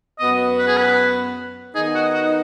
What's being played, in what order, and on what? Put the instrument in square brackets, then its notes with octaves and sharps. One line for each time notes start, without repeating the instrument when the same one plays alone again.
[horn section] F#2 F#3 B3 F#4 [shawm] D#5
[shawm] B4
G#4
B4
[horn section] D#3 B3 D#4 [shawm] G#4
[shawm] F#4
F#4